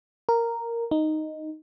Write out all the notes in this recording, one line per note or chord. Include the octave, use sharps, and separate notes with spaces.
A#4
D#4